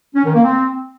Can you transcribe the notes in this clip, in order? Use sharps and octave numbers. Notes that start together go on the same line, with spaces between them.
C#4
D#3
A#3
C4